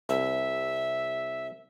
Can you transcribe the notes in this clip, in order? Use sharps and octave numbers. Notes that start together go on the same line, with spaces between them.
C2 E5